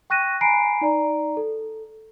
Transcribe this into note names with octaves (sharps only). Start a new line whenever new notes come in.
G5 C#6 F#6 A#6 D#7
G#5 A#5 B5 C7 D7
D#4 D5 A#5
A4